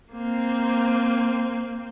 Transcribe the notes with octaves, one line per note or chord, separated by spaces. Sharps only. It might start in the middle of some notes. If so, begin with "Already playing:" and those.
A#3 C4